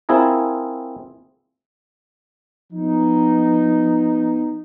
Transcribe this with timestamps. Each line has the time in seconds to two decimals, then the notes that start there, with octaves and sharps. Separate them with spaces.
0.09 C4 E4 F4 G#4 A#4
2.72 F3 B3 D#4